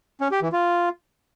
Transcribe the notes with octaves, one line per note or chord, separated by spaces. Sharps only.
C#4
G4
E3
F4